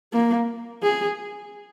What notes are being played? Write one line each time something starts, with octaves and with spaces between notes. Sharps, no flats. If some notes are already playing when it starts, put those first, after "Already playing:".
A#3
G#4